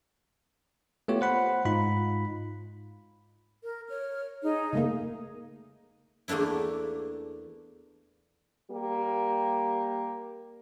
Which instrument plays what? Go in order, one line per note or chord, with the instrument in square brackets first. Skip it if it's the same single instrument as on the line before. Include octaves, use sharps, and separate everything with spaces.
[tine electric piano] A3 B3 F4 G4 C#5
C5 F#5 B5
G#2 D#4 F4 B5
[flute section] A#4
C#5 F6
D#4 G#4
[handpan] C#3 A3 A#3
[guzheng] E2 A3 A#3 D4 E4
[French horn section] G3 A#3 G4